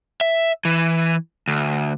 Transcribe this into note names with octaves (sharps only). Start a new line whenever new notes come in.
E5
E3
D2